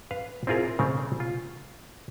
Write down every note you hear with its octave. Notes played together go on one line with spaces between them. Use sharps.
B4 F5
C4 E4 F4 G#4 A#4
C#3 A3 C4 C#4
F4